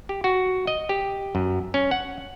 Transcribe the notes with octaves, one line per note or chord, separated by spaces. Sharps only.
G4
F#4
D#5
G4
F#2
C#4
F#5